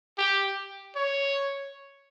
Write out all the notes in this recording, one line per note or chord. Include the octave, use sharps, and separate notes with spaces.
G4
C#5